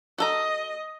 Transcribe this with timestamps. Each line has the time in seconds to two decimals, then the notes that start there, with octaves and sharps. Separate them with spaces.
0.18 F#4 A4 D#5 A#5